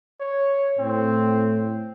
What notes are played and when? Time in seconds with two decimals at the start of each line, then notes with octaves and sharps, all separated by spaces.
0.20 C#5
0.79 A2 C4